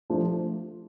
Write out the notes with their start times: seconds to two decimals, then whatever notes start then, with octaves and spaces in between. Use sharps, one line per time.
0.10 F3 A3 D4